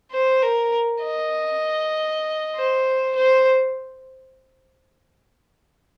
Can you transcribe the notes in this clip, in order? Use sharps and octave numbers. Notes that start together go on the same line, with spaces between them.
C5
A#4
D#5
C5
C5